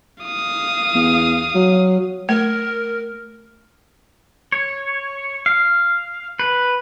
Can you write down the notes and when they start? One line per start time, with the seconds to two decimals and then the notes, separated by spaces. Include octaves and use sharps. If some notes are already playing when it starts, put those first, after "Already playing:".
0.24 F5 D#6
0.95 E2
1.55 F#3
2.29 A3 A#4
4.52 C#5
5.46 F5
6.39 B4